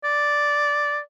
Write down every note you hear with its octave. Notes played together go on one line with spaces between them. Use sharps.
D5